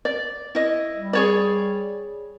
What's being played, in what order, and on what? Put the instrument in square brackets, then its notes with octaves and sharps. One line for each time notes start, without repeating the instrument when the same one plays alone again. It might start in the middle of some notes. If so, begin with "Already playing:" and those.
[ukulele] D5
E4 D#5
[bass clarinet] G3
[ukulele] G#4 C#5 D5